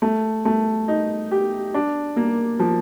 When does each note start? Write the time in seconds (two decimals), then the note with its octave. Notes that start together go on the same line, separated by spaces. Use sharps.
0.02 A3
0.45 A3
0.88 D#4
1.31 G4
1.74 D4
2.16 A#3
2.59 F3